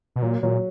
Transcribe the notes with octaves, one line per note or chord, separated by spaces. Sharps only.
B2
A#2 F#3
A#2 F#3